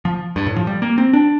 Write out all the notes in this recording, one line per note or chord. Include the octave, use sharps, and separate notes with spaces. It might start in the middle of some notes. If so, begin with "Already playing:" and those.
F3
G2
A2
F3
G3
A#3
C4
D4